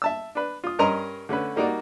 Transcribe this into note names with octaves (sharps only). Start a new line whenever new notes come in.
E5 A5 E6
D4 B4
F4 D#6
G2 C#4 A#4 D#5 A#5 C6
D3 A3 C#4 B4
G3 A#3 D#4 F#4 D5